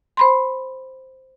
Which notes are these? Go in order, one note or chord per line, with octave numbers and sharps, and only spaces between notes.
C5 B5 C6